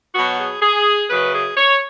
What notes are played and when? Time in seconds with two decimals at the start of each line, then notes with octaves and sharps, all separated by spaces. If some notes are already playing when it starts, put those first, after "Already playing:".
0.14 B2 F#3 B3 F#4
0.39 G#4
0.62 G#4
1.09 F#2 C#3 F#3 B4
1.34 G#4
1.57 C#5